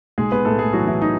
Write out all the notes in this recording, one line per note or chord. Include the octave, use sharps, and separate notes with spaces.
B1 G#3 G#4
B3 B4
A2 A3 A4
G#3 G#4
E3 F#3 F#4
E3 E4
D#4